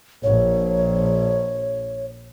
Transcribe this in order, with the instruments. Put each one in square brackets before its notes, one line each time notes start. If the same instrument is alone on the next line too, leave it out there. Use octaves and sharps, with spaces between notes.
[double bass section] A#1 [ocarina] C#5